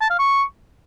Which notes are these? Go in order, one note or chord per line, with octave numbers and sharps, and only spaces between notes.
A5
F5
C#6